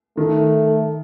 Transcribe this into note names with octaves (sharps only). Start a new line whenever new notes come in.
D#3 A3